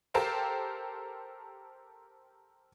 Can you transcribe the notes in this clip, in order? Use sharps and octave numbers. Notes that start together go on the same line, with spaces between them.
G4 A4 A#4 C5 F5 G5